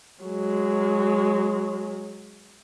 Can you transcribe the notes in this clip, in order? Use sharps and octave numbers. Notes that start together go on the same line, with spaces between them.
F#3 G#3